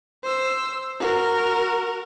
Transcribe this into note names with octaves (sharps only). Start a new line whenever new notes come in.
C5 E6
F#4 A#4